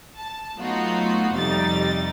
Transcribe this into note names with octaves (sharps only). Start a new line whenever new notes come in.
A5
F#3 A3 B3 D#4 F4 F#4
F2 C3 G3 D#4 A6